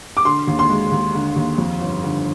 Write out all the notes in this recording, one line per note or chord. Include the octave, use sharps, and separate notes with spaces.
D6
D3 C6
D#2
C6
G#3
D#2
D3
D#2
F2
G1
D3